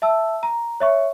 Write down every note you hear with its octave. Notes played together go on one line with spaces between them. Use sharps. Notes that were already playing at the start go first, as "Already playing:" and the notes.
E5 A5 E6
A#5
C#5 E5 C#6